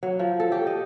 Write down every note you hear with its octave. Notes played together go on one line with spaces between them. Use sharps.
F#3
F3
A4
G4
D#5